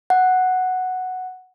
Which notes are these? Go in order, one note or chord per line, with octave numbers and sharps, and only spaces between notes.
F#5